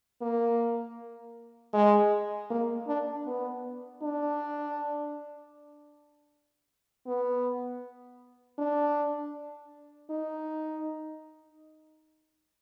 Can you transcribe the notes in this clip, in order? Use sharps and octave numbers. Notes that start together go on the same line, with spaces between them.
A#3
G#3
A#3
D4
B3
D4
B3
D4
D#4